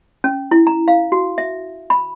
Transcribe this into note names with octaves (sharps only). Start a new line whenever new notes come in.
C#4
E4
A#5
F5
F#4
E5
B5